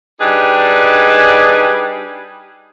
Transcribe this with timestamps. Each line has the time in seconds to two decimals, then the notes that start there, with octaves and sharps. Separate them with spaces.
0.21 G3 D4 D#4 G#4 B4